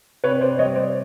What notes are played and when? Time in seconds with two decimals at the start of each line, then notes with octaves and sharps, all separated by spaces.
0.24 C3 B4 C#5
0.41 C5 D5
0.59 G3 C#5 D#5
0.76 C5 D5